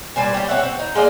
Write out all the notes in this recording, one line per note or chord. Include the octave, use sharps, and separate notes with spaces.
A#2 G3 C5 G#5
G3 C#4 E4 G4
C4 C#5 E5 F#5
C4
D#4
G#3 A#3 D5 D#5